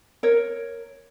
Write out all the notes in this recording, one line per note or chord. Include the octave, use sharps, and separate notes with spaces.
A#4 C#5